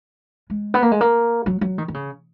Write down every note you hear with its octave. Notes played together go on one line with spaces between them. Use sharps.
G#3
B3
A#3
G#3
A#3
F#3
F#3
D#3
D#3
C#3